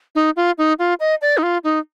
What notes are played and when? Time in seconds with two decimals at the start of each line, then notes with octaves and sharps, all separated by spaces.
0.15 D#4
0.36 F4
0.58 D#4
0.79 F4
1.00 D#5
1.22 D5
1.37 D#4
1.43 F4
1.64 D#4